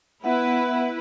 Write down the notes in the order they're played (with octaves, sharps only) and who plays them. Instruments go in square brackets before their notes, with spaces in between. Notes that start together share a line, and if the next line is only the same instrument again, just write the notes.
[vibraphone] B3 E5 F#5 [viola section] E4 B4